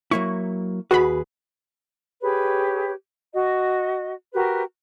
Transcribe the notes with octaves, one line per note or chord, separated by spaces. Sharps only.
F#3 A#3 E4 C#6
D#2 F#4 G#4 B4 B5
G4 G#4 B4 C#5
F#4 D#5
F#4 G4 A#4 B4